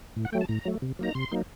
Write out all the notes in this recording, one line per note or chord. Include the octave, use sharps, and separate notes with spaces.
A2
F#5
F#3 A3 G5
A5
A2 A#5
F#3 A3
C3
F#3 A#3 D#4 A#5
C3 C6
F#3 A#3 D#4